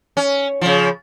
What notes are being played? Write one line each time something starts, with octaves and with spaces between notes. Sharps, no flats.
C#4
C#3 F3